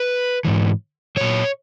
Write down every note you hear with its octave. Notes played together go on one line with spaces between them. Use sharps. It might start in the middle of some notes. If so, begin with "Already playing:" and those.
Already playing: B4
G#2 E3
A#2 F#3 C#5